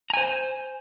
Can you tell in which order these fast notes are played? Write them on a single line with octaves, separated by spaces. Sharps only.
A#5 G#5 C5